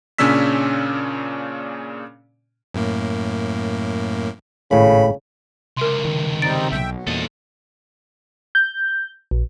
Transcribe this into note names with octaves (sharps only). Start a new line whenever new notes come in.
A#2 C#3 C#4 D4 E6 B6
F#2 A2 A#3
G#1 A2 C#3 B5
C#2 C3 A#4 C6
D#3
G3 C4 D#4 A6 D7
B1 E5 G5
F#3
E2 A#2 A4 D#5
G6
A#1